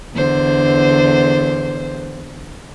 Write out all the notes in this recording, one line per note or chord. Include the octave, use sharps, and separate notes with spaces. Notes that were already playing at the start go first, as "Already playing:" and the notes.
E2 D3 C5